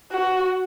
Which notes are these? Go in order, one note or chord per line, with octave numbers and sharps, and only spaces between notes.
F#4